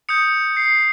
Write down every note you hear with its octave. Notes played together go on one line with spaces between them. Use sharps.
D#6 G6 C#7
C7